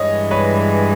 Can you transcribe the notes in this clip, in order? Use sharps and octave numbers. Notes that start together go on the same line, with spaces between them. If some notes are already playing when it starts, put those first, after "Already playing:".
Already playing: G2 E3 G#3 C#5 D#5
B4 C#5